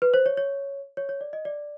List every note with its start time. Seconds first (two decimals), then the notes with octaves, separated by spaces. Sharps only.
0.02 B4
0.14 C5
0.26 C#5
0.37 C#5
0.97 C#5
1.09 C#5
1.21 D5
1.33 D#5
1.45 D5